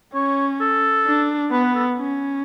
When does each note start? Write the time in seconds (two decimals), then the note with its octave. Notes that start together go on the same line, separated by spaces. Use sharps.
0.14 C#4 C#5
0.61 A4
1.07 D4
1.52 B3 B4
1.64 B4
1.75 A4
1.98 C#4